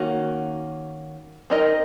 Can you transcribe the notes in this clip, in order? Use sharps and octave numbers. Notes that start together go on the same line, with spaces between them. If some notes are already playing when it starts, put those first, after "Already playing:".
Already playing: D#3 A#3 C#4 F#4
C4 D#4 A#4 D#5